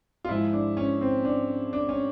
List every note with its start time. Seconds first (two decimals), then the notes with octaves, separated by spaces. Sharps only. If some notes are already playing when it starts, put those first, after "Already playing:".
0.25 F4
0.29 G#2 F3 G#3 E4
0.53 D4
0.77 C#4
1.01 C4
1.25 D4
1.73 D4
1.89 C#4